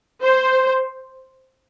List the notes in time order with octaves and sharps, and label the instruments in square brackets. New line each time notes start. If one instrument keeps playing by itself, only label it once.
[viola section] C5